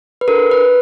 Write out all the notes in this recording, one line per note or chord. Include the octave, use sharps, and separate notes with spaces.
B4
D4 F#4 A4 A#4
B4